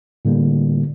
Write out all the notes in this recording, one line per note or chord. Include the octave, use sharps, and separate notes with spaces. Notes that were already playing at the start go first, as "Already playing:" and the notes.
A2 D3 G3 A#3